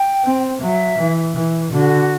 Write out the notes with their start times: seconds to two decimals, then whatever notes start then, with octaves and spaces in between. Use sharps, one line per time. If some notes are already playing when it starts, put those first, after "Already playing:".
Already playing: G5
0.24 C4
0.61 F#3 E5
0.98 E3
1.35 E3
1.71 D3 F#4